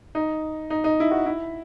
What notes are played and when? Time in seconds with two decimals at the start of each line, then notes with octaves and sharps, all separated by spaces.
0.15 D#4
0.70 D#4
0.84 D#4
1.00 E4
1.11 F#4
1.26 E4